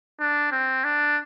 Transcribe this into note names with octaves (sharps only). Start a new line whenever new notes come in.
D4
C4
D4